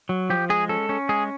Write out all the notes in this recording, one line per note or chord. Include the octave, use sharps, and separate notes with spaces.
F#3
F3 G4
G#3 G#4
C#4 A4
C#4
G#3 G#4